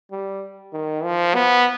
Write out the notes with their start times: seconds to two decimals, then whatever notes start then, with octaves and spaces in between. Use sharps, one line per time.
0.12 G3
0.73 D#3
1.04 F3
1.35 B3